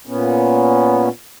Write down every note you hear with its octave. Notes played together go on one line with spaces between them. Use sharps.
A#2 B3 C#4